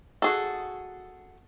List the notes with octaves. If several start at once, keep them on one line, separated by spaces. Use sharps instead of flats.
F#4 G#4 A4